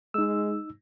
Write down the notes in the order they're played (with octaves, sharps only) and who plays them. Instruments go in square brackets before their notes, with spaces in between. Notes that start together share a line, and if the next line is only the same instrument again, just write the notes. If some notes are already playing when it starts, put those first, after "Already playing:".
[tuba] G#3 [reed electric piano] D#4 E6